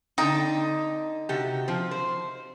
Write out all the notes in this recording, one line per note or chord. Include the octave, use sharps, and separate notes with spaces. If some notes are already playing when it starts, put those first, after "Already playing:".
D3 C4 D#4 G5
C3 F#4 G4
F3 C4
C5